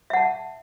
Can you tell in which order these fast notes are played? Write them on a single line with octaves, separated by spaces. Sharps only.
E5 F#5 A5